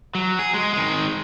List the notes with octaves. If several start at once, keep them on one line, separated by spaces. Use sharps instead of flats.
F#3
G#4
G#3
D#3 G#3